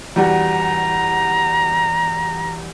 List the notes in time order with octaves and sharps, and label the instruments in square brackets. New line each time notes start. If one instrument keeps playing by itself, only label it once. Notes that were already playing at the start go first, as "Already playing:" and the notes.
[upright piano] E2 G3 F#4 [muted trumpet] A#5